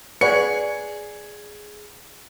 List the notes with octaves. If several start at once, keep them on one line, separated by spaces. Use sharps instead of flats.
G#4 B4 C#5 D5 F#5 C#7